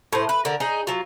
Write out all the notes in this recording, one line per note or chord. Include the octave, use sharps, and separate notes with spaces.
A2 C5
B4
D3 A#4
D#4 G#4 D#5
F#3 F4